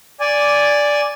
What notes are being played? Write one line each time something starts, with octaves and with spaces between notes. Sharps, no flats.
D5 G#5